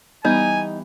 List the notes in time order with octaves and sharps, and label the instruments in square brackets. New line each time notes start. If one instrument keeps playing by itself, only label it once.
[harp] E3 G3 B3 [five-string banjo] D#4 [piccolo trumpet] G#5